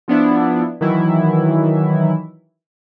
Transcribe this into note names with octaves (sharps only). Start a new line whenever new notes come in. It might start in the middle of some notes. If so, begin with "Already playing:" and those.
F3 B3 D4 E4
D#3 E3 F#3 E4